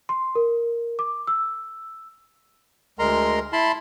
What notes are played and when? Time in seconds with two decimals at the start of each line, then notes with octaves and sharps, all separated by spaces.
0.09 C6
0.35 A#4
0.99 D6
1.27 E6
2.99 D2 G#3 A#4 A#5 C6
3.53 E4 A5 B5 C6